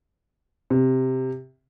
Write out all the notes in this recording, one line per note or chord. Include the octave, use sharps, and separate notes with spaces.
C3